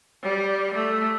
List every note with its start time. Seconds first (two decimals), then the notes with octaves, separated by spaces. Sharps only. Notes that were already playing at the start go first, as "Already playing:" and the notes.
0.23 G3
0.74 A3